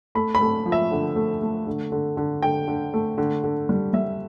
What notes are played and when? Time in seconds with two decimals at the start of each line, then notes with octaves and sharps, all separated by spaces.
0.15 A3 B5
0.35 B5
0.41 A3
0.66 F3
0.72 E5
0.92 D3
1.16 A3
1.41 A3
1.67 D3
1.92 D3
2.17 D3
2.42 D3 G5
2.68 D3
2.94 A3
3.18 D3
3.44 D3
3.69 G3
3.93 G3 E5